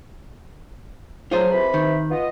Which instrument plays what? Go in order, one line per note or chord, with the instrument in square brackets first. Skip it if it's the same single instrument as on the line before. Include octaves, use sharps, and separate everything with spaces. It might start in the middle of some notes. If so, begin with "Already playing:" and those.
[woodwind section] F3 F#3 [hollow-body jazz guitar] F4 G#4 C5
[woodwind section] C3 E3 B5
[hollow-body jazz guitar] D#3
[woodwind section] B3 F4 D#5